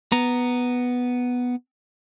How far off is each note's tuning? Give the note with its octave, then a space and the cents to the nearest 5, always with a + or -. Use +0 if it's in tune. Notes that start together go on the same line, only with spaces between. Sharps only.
B3 +0 A#5 +0